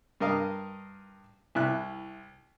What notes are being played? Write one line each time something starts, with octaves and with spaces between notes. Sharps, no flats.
G2 A#4 D#5 F5
C2 E4 F#6